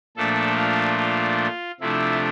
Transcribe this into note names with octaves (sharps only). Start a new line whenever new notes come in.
A#2 F3 A3 D4 A4
F4
F4
C3 F3 A3 D4 E4